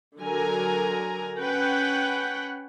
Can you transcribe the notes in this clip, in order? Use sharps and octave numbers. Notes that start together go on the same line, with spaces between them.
D3 F#3 A#4 G#5 A#5
C#4 B4 F#5 G5